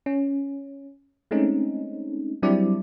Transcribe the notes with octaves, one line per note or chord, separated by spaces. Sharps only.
C#4
G#3 A3 C4 C#4 D#4
F#3 G3 C4 D4 E4 D5